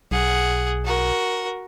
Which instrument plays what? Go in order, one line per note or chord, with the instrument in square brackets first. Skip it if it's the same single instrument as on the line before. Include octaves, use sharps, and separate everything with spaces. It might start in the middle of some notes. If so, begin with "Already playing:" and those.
[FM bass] B1 [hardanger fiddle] G#4 F#5
[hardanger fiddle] F#4 A#4